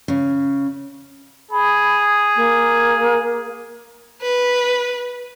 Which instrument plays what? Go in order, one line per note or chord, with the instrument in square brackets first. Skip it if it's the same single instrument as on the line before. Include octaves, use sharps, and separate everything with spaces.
[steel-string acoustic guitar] C#3
[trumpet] G#4 [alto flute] B5
[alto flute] A#3
[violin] B4